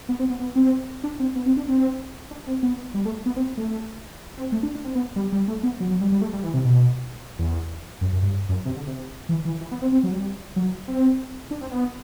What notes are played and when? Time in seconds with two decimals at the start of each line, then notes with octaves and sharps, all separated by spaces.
0.09 B3
0.19 C4
0.30 B3
0.40 B3
0.56 C4
1.04 D4
1.19 C4
1.35 B3
1.46 C4
1.57 D4
1.68 C4
2.31 D4
2.46 C4
2.63 B3
2.94 G3
3.05 A3
3.26 B3
3.36 C4
3.57 A3
4.37 C4
4.52 A3
4.63 D4
4.75 D4
4.84 C4
4.95 B3
5.16 G3
5.32 G3
5.48 A3
5.63 B3
5.80 F#3
5.91 F#3
6.01 G3
6.12 G3
6.21 A3
6.33 G3
6.44 E3
6.54 C3
6.65 B2
7.39 E2
8.01 F#2
8.13 F#2
8.22 G2
8.49 F#2
8.65 C3
8.76 D3
8.87 C3
9.29 E3
9.45 E3
9.61 E3
9.72 B3
9.82 C4
9.92 C4
10.03 F#3
10.13 G3
10.56 F#3
10.88 C4
11.51 D4
11.61 C4
11.71 B3